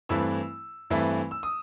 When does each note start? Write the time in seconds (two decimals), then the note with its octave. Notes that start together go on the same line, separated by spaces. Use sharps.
0.09 G2 E3 A3 C4 E4 E6
0.90 G2 E3 A3 C4 E4
1.31 E6
1.43 D#6